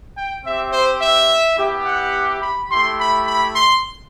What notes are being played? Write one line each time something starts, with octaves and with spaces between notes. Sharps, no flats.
G5
C4 G4 E5
C5
E5
B3 E4 G4
F#5
B5
A3 E4 G4 C6
B5
B5
C6